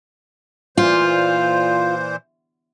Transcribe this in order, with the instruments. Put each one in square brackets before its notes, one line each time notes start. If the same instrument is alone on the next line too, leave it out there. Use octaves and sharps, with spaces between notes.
[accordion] A#2 E3 C5 [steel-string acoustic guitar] F4